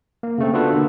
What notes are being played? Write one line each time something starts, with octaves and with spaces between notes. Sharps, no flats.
A#3
C#3 A3 C4
B3 D4 F4 F#4 A4 B4
D3 A#3